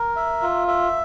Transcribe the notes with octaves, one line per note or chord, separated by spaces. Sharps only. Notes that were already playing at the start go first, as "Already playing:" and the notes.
Already playing: A#4
E5
F4
E5